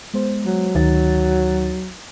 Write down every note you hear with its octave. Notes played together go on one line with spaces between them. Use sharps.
G#3 B3 C5
F#3
D2 D#3 D#4 A6